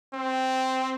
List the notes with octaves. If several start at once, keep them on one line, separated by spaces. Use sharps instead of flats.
C4